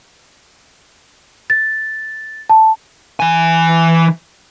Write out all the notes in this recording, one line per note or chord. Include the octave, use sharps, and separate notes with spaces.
A6
A5
E3 G#5